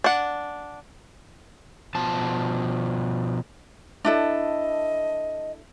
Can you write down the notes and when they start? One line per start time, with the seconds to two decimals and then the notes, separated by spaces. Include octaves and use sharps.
0.04 D4 F#5
1.95 B2 F3 A5
4.05 D4 E4 A4 D#5